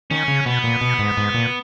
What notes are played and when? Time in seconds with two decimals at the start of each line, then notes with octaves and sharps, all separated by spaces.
0.11 D#3 C#4
0.28 C#3
0.46 B2 B3
0.64 A#2
0.81 B2
0.99 G#2
1.17 G#2
1.34 A#2